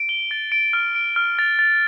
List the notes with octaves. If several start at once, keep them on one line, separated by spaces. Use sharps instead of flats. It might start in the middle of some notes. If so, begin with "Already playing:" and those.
Already playing: D7
G7
A6
D7
F6
D7
F6
A6
A6